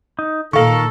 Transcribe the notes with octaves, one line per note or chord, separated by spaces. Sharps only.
D#4
A#2 D#3 A4 A#4 F5 C#6